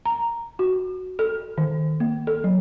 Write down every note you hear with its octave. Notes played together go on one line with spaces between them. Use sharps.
A#5
F#4
A4
D#3
A#3
A4
F#3